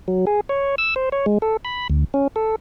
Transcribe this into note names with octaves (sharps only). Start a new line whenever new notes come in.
F#3
G#4
C#5
E6
C5
C#5
G#3
A4
B5
D2
C#4
A4